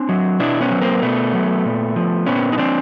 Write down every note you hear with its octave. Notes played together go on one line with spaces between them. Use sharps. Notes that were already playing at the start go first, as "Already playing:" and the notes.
Already playing: C4 D4
F#3
B2 D4 E4
B3 C#4
F#3
A#3 C4
B2 A3 B3
F#3
A#2
F3
A#2 B3 C#4
D#4
F3 C4 D4